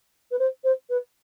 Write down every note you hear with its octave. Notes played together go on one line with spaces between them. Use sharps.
B4
C5
C5
B4